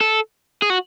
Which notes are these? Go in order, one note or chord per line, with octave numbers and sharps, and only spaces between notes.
A4
G#4
F#4